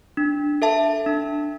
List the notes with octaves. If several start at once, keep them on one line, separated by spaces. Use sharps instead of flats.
D4
A4 E5 A5
D4